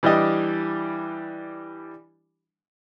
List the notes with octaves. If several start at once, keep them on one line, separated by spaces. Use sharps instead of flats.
E3 G3 D4 G4 D#5